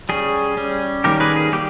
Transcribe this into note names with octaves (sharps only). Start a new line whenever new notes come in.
G3 C#4 G#4
G3 C#4
D#3 G3 A#3 C#4 G4 A#4
G#4 B4
G#4
D#3 G3 G4